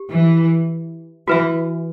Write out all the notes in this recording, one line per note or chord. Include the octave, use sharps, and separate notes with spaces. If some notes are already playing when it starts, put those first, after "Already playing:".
Already playing: G4
E3
E3 F#4 B4 E5